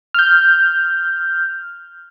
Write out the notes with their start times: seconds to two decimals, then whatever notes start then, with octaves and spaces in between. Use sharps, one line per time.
0.14 F6 G6